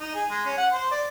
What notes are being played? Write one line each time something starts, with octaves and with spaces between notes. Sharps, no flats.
D#4
G#4
G#3
C#4
F#5
C5
D5